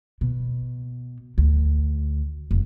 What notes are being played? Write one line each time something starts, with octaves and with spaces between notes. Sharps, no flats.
B2
D2
F1